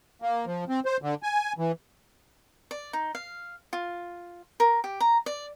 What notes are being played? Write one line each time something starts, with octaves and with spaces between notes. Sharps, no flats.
A#3
F3
C4
C5
D3
G#5
E3
D5
D#4
F5
F4
A#4
G4
A#5
D5